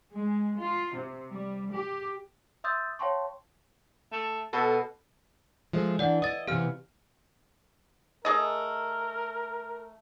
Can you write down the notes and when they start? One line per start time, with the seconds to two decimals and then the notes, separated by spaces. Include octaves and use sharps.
0.14 G#3
0.60 F4
0.96 C3
1.29 G3
1.74 G4
2.64 E5 C6 D#6 E6 G6 A6
2.99 C#5 F5 G5 A5 C6 C#6
4.12 A3
4.53 B2 A4
5.73 F3 G#3 A3
5.99 E3 D4 D5 F#5
6.22 E4 D#5 D#6 A6
6.47 C3 E3 B3 G4 F5 F6
8.25 A3 G#4 A#4 D#5